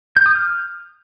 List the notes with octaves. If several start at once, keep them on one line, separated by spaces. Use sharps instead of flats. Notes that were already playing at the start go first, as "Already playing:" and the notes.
G6
D#6
F6